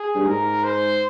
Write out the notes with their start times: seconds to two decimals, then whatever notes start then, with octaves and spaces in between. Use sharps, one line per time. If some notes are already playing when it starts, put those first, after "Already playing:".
Already playing: G#4
0.15 G2
0.26 G#2 A#4
0.64 C5